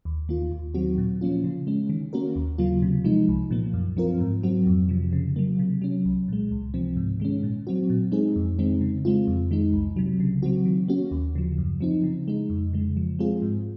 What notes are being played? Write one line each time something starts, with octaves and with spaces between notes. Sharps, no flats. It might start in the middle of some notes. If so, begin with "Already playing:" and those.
D#2
D#3 A#3 F4
D#2
D#3 F#3 C4 F#4
A#2
F3 A#3 C#4 F4
C#3
G#3 C#4
D#3
A#3 C#4 F#4 A#4
D#2
C#3 F#3 A#3 F4
C3
F3 G#3 D#4
C2
A#2 F3 A#3
F#2
F3 C4 F4 A#4
G#2
F#3 C4 F#4
F2
C3 F3
C#3
F#3 A#3
C3
F#3 C#4
C2
A#2 G#3
C#2
C3 F3 C4
G#2
D#3 G#3 C#4
A#2
F#3 C4 F#4
A#2
G#3 C4 D#4 G#4
F2
D#3 G#3 C4 D#4
C#3
G#3 C4 F4
F2
D#3 G#3 D#4
C2
C3 F#3
C#3
F#3 C4 F#4
D#3
A#3 C#4 F#4
D#2
C#3 F3
F#2
F3 C4 D#4
C#3
G#3 D#4
F2
C#3 G#3
F3
G#3 C4 F4 G#4
G#2